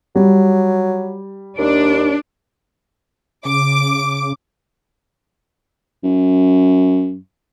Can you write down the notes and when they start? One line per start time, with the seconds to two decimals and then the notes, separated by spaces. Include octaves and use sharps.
0.16 F#3 G3
1.58 D#2 D4
3.45 C#3 D6
6.04 F#2